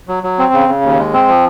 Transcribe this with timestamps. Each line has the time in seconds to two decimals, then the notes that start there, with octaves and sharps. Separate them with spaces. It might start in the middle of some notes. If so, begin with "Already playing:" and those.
0.08 F#3
0.23 F#3
0.39 C4
0.53 C#3
0.69 C#3
0.83 D#2
0.98 G#3
1.13 C4
1.28 F3